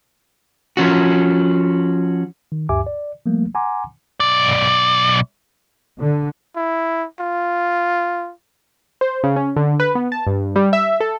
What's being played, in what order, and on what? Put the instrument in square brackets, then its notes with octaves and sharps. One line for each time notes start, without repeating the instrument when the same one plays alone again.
[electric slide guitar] F3 C#4 F#4
[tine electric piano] D#3
D2 G2 G4 E5 G#5 D6
D5
F3 G3 A3 A#3
F#5 G#5 A#5 C6 D6
[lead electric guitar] B1 D5
[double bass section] D3
[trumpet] E4
F4
[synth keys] C5
C#3
C#4
D3
B4
B3
A5
G2
G3
E5
A4